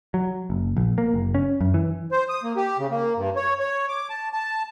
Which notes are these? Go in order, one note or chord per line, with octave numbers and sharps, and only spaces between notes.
F#3
F#1
A#1
A#3
F#1
C#4
F#2
E3
C5
D#6
A#3
G4
C#3
A#3
G2
C#5
C#5
D6
A5
A5